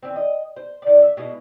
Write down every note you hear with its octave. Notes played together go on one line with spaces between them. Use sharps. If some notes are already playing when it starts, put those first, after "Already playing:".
E3 C4
D#5
C5
D#3 D5
E5
B2 G#3 E4 D#5